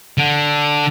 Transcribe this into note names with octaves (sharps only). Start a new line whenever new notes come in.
D3